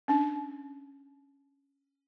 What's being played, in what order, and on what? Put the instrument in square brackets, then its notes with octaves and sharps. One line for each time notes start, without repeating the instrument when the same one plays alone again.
[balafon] C#4 D4